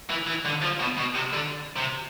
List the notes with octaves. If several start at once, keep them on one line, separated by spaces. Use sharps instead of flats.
E3
E3
D3
F3
B2
B2
C3
D3
C3